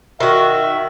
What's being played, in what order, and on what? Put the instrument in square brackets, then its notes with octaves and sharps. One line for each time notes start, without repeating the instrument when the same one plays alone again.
[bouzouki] D#3 F#4 [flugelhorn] E5